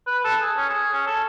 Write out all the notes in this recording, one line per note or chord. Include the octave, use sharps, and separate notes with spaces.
B4
A4
G#4
C#4
G#4
C#4
A4